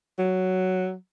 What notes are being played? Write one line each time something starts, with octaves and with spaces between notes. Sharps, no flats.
F#3